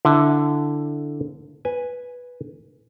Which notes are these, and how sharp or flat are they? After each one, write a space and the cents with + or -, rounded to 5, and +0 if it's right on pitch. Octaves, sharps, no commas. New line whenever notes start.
D3 +0 E4 +0
B4 -5 G#5 +0